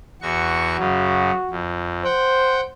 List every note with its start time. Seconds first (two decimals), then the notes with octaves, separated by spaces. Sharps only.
0.22 E2 F#4 C#6
0.78 F#2 C#3 F#4
1.51 F2
2.04 C5 F#5 G5